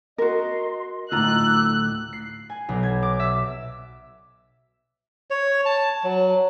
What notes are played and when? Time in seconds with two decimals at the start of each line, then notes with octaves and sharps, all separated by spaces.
0.18 F#4 A#4 D#5 C6
1.12 D2 A2 D#4 F4 A#5 D6 E6 F#6
2.13 C7
2.49 G#5
2.69 B1
2.83 G#6
3.03 D6
3.20 E5
5.30 C#5
5.66 A5
6.04 F#3